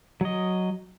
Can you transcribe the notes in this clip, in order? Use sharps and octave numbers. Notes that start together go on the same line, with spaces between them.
F#3 D#5